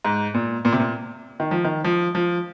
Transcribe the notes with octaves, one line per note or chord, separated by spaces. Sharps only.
G#2
A#2
A#2
C3
A#2
D#3
F3
D#3
F3
F3